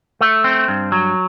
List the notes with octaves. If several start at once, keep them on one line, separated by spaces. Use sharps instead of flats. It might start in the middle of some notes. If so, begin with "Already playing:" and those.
A3
C4
G2
F#3